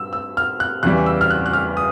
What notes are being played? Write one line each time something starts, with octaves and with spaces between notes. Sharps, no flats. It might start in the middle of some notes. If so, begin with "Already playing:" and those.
Already playing: G2 E6
E6
F6
F#6
E2 C#3 E3 G3 F#6
E6
F6
F#6
F#6
F6
D#6